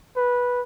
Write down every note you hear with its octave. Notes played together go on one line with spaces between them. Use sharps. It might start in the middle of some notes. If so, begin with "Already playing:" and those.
B4